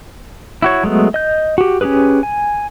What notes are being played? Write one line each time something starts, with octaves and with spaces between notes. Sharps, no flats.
E4 F#4 C#5
F#3 G#3 A3 B3
D#5 G6
F#4 G4
C#4 D#4 G4 G#4 B4
G#5